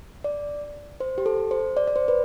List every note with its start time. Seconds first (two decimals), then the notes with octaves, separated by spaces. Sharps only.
0.24 D5
1.00 C5
1.18 G4
1.26 A4
1.51 C5
1.77 D5
1.87 D5
1.96 C5
2.08 B4